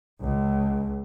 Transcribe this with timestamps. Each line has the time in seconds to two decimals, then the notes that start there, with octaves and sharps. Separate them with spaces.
0.22 C#2